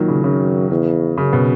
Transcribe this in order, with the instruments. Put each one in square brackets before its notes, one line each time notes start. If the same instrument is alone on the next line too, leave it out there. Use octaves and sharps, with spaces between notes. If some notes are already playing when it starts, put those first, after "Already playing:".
Already playing: [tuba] A#2 [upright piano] D#3 F#3
[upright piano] C#3
[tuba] F#2 [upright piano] C#3
[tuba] E2
[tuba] F#2 [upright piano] C#3
[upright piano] B2